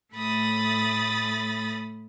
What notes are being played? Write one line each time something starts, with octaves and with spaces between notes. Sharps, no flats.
A2 A3 B5 D#6 A6